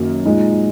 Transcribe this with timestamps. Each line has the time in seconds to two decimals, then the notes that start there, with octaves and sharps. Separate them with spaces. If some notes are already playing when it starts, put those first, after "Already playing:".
Already playing: F#2 D#3 A#3
0.25 A#2 G#3 D#4